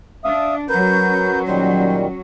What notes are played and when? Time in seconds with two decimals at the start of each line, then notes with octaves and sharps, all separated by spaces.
0.24 D4 E5 F5 D#6
0.69 F#3 C#4 F#4 A#4 B4 G6
1.47 A#2 D#3 G3 C5